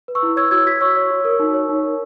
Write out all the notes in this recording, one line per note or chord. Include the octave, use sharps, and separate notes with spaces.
B4
C#6 E6
E4
C#5 E6 G#6
F#4 E6 G#6
F#4 G#6 B6
C#5 C#6 E6
C#5
F#4
A#4
D#4
C#5
D#4
A#4